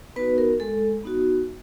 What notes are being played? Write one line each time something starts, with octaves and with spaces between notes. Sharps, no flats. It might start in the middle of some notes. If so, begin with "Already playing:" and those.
B3 D#4 F#4 B4
A#4
G#3 A4
B3 D#4 F#4